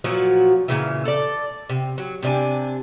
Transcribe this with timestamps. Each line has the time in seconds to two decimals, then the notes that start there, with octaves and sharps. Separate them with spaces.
0.04 A#2 F3 F#3 F#4
0.68 A#2 C#3 E3
1.05 A4 D5
1.70 C3
1.98 F#3
2.23 C3 D4 G#5